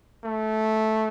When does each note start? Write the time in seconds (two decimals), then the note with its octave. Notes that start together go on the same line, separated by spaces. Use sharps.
0.24 A3